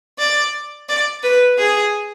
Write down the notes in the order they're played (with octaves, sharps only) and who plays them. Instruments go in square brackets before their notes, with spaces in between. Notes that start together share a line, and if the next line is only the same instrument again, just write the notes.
[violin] D5
D5
B4
G#4